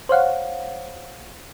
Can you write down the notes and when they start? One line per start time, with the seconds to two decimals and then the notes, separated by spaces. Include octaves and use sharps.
0.09 C5 C#5 F5 F#5